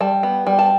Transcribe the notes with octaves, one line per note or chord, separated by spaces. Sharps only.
G3 A5
B3
G3
A5